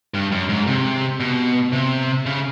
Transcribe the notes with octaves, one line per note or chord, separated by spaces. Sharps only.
G2
F#2
G#2
C3
B2
C3
C#3